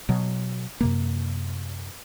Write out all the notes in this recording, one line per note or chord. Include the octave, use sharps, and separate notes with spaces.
B2 F#3
F#2 C3 A#3